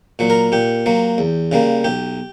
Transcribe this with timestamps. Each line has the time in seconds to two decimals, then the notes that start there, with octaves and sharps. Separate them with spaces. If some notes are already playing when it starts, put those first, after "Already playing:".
0.19 A#2 F#3
0.30 A#4
0.52 A#2 G4
0.86 F#3 A#3
1.18 E2
1.52 C#3 G3 A#3
1.84 B1 G4